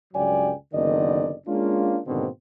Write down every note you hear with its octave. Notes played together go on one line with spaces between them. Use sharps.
C#2 G2 F#3 D5 G5 G#5
F#1 D3 D#3 B3 D5 D#5
G#3 A#3 C#4 D4 F4
G#2 B2 D3 D#3 A#3 C4